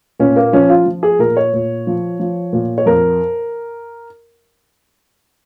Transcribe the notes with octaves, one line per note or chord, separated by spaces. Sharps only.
A#2 C#4
A#3
F3 C#4
F4
F3
G#4
A#2 A#4
C#5
A#2
F3
F3
A#2
C#5
F2 A#4